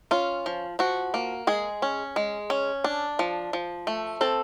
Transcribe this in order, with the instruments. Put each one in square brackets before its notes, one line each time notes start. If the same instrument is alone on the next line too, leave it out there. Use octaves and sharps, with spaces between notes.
[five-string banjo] C#4 F4
F3
F3 F#4
A#3
G#3 G#4
C#4
G#3
C#4
D4
F3
F3
A3
C4 A4